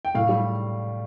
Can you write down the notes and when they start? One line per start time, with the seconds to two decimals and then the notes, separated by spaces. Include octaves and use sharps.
0.05 G5
0.15 A2 F5
0.29 G3